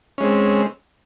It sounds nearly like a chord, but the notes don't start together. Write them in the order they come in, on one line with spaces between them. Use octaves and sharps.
C#4 G#3 C4